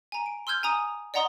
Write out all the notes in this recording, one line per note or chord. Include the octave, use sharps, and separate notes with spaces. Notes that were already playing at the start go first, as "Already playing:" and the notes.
G#5 A#5
D7
C6 E6 F6 G6 G#6
G#5 A#5 D#6
D5 D#5 F#5 A#5 C6 D#6